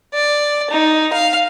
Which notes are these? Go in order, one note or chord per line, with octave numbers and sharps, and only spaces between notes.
D5
D#4
F5